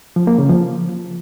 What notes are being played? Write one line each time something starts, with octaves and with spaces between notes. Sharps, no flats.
F3
A#3
C#3
F3